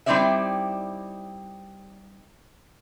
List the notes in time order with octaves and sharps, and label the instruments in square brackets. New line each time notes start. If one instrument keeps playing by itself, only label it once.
[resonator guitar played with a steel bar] G3 C4 D#4 E4 D5 E5